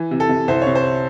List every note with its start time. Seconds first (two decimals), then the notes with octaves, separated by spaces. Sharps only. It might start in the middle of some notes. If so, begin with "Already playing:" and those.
Already playing: E3
0.11 C3
0.20 A4
0.29 C3
0.48 C2 C5
0.62 C2 C#5
0.75 C5